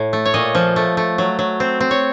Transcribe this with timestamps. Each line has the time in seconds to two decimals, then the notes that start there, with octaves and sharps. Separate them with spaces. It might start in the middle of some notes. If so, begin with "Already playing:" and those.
Already playing: A2
0.13 A3
0.25 C#5
0.34 A#2 D#5
0.55 F3
0.76 A3
0.97 A3
1.18 F#3
1.39 F#3
1.60 C4
1.80 C4
1.91 C#5